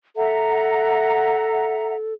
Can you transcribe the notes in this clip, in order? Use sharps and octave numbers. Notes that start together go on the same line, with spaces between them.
A4 E5 F#5 A#5